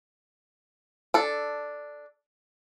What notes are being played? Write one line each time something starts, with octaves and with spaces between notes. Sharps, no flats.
D4 A4